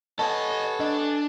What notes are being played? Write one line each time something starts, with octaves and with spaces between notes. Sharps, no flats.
B3 A4 C#5 D#5 G#5 A5
D4 D#5